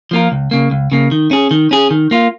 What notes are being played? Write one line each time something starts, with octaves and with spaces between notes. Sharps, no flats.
F3 A#3 F4 A#4
C#2
C#3 A#3
C#2
C#3 A#3
D#3
C#4 G#4
D#3
C#4 G#4
D#3
A#3 F4